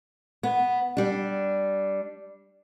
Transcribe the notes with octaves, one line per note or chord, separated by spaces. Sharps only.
B3
G3 D4